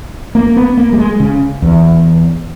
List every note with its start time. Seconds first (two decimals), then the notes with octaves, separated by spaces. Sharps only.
0.35 A#3
0.57 B3
0.77 A#3
0.92 G3
0.99 G#3
1.20 C#3
1.62 E2